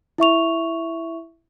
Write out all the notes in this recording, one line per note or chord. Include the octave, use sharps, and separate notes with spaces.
E4 E5 C#6 F7